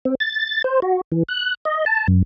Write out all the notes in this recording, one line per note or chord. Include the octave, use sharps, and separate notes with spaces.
C4
A6
C5
F#4
E3
F#6
D#5
A5
F#2